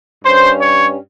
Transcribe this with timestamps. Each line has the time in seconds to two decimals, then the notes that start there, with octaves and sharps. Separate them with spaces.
0.25 G2 G3 C#4 C5
0.61 C#5